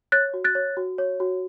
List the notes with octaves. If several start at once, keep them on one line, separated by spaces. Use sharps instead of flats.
C#5 F#6 A6
F#4
F#6 A6
C#5
F#4
C#5
F#4